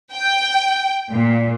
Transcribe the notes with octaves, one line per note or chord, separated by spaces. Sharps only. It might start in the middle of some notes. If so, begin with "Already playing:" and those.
G5
A#2